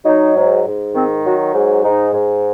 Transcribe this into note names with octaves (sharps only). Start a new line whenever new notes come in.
F#3 D#4
G#2
G#2
D#3 C4
F#3 F#4
G#2
G#2 D#4
G#2